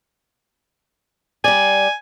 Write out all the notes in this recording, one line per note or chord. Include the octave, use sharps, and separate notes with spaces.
G3 D5 G#5